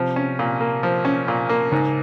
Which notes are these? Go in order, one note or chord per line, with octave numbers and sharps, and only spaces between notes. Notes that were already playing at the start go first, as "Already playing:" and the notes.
Already playing: C3 F3
C#4
A#2
A#3
F3
C#4
A#2
A#3
G#2 C#3